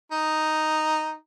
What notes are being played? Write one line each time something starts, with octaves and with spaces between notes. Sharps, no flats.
D#4